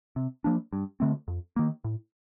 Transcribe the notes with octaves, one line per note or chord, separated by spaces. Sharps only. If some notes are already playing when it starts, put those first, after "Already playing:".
C3
F3 A#3 D4
G2
D3 A3 C4
F2
D#3 A#3
A2